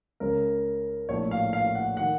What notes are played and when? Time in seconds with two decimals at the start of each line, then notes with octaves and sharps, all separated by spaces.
0.20 C#2 C#3 A#4
1.09 A#1 A2 C#5
1.31 F5
1.53 F5
1.75 F#5
1.97 D#3 F#5